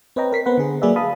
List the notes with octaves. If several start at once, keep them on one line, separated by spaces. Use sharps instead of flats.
C4 B4 C#5 D#5 G5 A#5
A#4 B6 C7
B3 B4 C5 F#5
D3 G#4
F#3 A#3 G#4 B4 D5 E5
F5 A5 B5 D#6